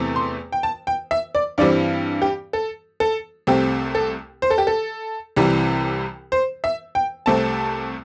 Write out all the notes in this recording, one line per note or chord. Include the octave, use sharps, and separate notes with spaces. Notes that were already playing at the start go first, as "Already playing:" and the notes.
Already playing: E2 C3 E3 A3 C4
C6
G5
A5
G5
E5
D5
G2 E3 G3 C4 D5
G4
A4
A4
C2 C3 A3 C4 G4
A4
C5
A4
G4
A4
C2 C3 E3 G3
C5
E5
G5
C2 C3 A3 C4 A5